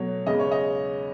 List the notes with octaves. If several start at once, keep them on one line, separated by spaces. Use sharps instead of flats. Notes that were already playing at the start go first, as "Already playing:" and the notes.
Already playing: B2 F#3 A3 C#5
E2 C#3 G#3 D#5
C#5
D#5